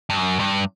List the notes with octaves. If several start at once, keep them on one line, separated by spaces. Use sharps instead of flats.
G2
F#2
G2